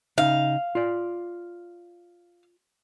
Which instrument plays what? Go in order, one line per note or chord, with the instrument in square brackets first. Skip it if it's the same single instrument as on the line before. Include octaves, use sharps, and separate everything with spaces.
[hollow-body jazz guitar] C#3 D#4 [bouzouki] F5
[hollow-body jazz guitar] F4 D5